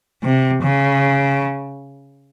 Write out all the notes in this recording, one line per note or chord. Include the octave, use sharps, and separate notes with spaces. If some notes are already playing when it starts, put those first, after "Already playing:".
C3
C#3